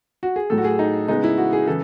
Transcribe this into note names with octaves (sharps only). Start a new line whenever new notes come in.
F#4
G#4
A2 F#3 A3 A4
F#4
G#4
D#4
C#3 G#3 B3 D#4
E4
F#4
G#4
C#3 E3 A4